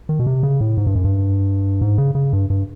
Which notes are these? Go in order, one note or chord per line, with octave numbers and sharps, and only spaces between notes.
D#3
B2
C3
C#3
A2
G#2
G2
F#2
G2
G#2
C#3
C#3
G2
G2